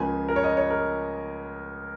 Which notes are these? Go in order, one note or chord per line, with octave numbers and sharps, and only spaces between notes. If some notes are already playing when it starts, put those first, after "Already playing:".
Already playing: C#2 C#3 F3 A#3 G#5
A#4
C#5
D#5
C#5
A#4